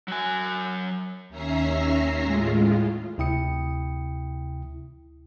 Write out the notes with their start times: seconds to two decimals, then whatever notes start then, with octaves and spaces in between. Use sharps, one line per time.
0.08 F#3 G#5
1.29 D#2 C#4 E5 A#5 A#6 C7
2.23 A2 G#3 F4
3.18 D2 C3 E4 G5 D#6 C#7